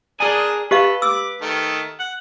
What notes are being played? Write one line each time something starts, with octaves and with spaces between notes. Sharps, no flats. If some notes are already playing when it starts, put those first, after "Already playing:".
D4 G#4 A#4 D5 G#5 D#6
G4 A4 B4 D#5 F5
D6 E6
D#3 A3
F#5